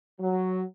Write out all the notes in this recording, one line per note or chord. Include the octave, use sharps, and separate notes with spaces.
F#3